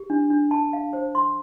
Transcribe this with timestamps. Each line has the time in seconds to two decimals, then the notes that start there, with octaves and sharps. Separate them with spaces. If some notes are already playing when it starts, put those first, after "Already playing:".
Already playing: G4
0.10 D4
0.30 D4
0.51 A5
0.73 F5
0.93 C5
1.15 C6